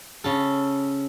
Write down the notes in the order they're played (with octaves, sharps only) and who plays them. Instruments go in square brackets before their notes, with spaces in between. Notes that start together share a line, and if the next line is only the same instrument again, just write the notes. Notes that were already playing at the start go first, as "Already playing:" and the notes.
[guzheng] C#3 A4